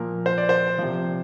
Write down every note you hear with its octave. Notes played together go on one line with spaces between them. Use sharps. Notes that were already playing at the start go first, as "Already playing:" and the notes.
Already playing: A#2 F3 A#4
C5
D5
C5
C3 F3